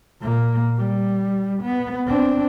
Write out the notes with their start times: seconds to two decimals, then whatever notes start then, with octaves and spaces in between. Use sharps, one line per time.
0.20 A#2 A#3
0.77 G3
1.62 B3
2.06 C4 D4